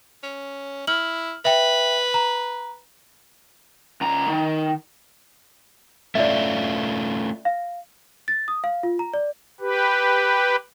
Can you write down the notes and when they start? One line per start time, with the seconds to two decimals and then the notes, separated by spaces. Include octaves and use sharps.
0.23 C#4
0.87 E4 F6 F#7
1.45 B4 E5 G5
2.14 A#5
4.01 C#2 A#5
4.28 D#3
6.15 A3 C#4 F4 D5 E5
7.45 F5
8.28 A6
8.48 D#6
8.64 F5
8.83 F4
8.99 A#5
9.14 D5
9.60 G4 B4